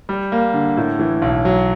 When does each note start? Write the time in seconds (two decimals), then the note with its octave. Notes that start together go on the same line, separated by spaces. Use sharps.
0.09 G3
0.32 A#3
0.54 D3
0.77 A2
0.99 E3
1.22 B1
1.45 F#3